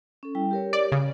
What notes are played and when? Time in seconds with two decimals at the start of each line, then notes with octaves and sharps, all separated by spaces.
0.23 C#4 A4
0.35 G3 E4 G5
0.51 G4 A#4 C#5
0.73 D5
0.92 C#3